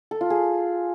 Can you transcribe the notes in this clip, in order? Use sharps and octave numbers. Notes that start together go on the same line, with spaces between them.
A4
F4
G#4